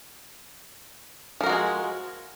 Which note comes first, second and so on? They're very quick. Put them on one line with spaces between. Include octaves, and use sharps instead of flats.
F3 A#4 F#4 G#3 G#4